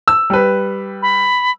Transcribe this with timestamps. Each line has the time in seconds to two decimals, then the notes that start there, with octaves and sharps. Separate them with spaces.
0.08 E6
0.30 G3 B4
1.02 B5